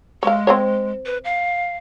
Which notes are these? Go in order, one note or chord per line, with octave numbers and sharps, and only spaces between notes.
G#3 C#5 F5
C4 C5 C#5
B4
F5